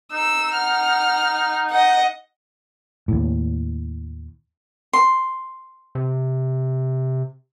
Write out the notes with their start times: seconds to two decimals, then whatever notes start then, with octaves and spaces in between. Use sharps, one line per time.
0.13 D#4 E6
0.56 F#5 F6
1.70 D#5 F#5
3.08 D#2 A2
4.93 C6
5.95 C3